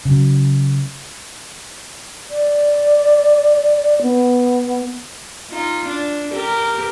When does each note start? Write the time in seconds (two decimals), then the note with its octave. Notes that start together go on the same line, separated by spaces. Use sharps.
0.05 C#3 F#3
2.31 D5
4.02 B3
5.51 D#4 F4
5.88 D4
6.33 G4 A#4